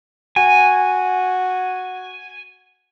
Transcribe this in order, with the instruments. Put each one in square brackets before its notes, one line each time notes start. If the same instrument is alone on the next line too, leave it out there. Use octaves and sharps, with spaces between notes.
[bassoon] F#4 [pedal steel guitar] G#5